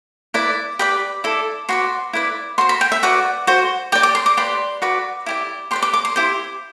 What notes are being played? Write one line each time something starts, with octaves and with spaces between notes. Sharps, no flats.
E4 B4 D5
G4 B4 D5 B5
E4 A4 D5
F#4 B4 D5 C6
E4 B4 D5
F#4 C5 C6
B5
G5
E5
F#4 B4 D5 F#5
F#4 C5
G4 D5 G5
D6
C6
D6
G4 B4 D5 C6
F#4 B4 D5
E4 G4 D5
G4 B4 D5 C6
D6
D6
C6
E4 G4 C5